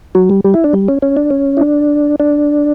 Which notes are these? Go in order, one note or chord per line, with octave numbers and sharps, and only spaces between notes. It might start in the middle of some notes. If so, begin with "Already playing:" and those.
F#3
G3
G3
E4
D4
G3
C#4
C#4
D4
C#4
E4
D4
D4